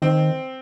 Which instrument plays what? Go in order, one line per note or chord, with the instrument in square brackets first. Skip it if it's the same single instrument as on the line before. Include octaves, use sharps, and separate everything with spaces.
[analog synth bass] D#3 [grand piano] C4